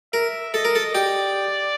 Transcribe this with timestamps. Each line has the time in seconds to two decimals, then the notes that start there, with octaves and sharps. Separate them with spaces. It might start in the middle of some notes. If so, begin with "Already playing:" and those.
0.13 A#4 E5
0.54 A4 D#5
0.65 A#4
0.75 A4
0.95 G4 D5